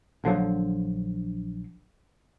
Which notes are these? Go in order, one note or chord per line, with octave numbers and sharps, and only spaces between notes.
A#1 D3 F3 F#3